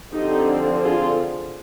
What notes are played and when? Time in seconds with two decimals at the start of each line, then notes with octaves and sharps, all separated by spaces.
0.12 D3 F3 C4 D#4 G4
0.83 F4 G#4